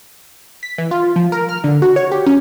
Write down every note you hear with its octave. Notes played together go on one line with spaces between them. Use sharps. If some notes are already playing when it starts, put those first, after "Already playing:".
B6
E3
F4
F3
A#4
F6
D3
F#4
C#5
G4
C#4